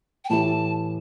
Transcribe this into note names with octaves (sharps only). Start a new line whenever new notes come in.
G5
A2 E3 A3 E4 G4 A5